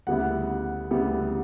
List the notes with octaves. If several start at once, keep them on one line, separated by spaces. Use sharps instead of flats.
D2 C#3 G3 B3 E4 F#5
D2 C#3 G3 B3 E4